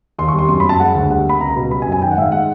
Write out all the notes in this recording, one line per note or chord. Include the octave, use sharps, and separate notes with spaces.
D#2 C6
C#6
G3
C6
F#2 C6
B5
F#2
A5
G#3 F#5
D2
G3 F#5
A#3 B5
C#2 A#5
B2
G3 B5
G#5
F#2
G#5
D#3 G5
F#5
G#2 E5 F5
G#3 F#5